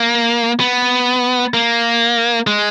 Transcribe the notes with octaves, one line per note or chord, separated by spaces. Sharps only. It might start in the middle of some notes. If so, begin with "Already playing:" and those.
Already playing: A#3
B3
A#3
G#3